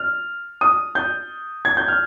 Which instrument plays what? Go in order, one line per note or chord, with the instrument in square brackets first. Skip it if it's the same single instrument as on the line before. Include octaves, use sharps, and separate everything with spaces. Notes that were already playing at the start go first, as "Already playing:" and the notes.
Already playing: [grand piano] F6
D#6
G6
G#6
G6
F6